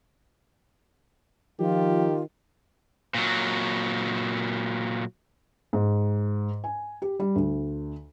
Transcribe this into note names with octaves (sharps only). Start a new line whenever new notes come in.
D#3 F3 F4 G4
A#2 F#3
G#2
G#5
G4
G3
D2